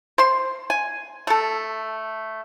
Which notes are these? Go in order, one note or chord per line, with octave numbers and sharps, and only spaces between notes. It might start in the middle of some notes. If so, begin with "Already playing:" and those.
C5 C6
G#5
A3 A4